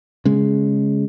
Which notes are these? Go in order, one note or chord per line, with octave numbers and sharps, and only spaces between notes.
C#3 G#3